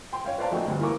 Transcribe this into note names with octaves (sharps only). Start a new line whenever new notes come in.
G5 C6
C#5 F5 G5
B4 C5 D5 F5 A5 A#5
A#1 A3 D#4 F#4 G5
D2 G2
E3 A#3 A#5 C#6 D6